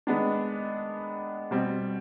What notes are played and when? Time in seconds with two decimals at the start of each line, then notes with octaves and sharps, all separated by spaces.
0.07 D#3 G#3 B3 D4
1.51 B2 G3 C4